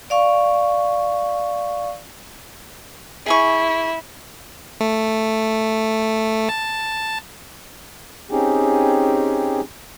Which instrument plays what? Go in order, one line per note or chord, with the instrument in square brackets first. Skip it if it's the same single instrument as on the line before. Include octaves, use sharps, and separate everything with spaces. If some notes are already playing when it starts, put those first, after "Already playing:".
[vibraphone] D5 F5 C#6
[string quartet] E4 [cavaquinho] G#4 G#5 C#6
[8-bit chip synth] A3
A5
[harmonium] C4 C#4 D#4 G4 G#4